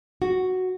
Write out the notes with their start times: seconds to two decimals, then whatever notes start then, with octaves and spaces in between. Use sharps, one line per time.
0.22 F#4